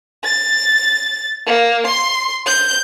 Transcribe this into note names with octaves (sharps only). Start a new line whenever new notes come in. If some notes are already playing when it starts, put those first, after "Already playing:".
A6
A#3
C6
G6